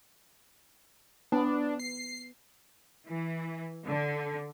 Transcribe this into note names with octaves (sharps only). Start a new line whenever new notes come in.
B3 D4
C7
E3
D3